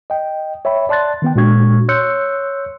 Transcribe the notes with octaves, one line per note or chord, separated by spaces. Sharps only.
D#5 G5
C#5 E5 G5 B5
D5 A5 C6 F#6 A6
D#3 B3 G5
A#2 G#3 D4 F#4 C#6 G#6
C#5 C6 E6 F#6 G6 C#7